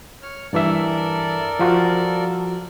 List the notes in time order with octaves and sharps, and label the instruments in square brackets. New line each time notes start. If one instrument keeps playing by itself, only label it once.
[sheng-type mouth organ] C#5 F6
[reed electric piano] G2 E3 E5 [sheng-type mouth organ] A4 A#4 D5
[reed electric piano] F3 F4 F#4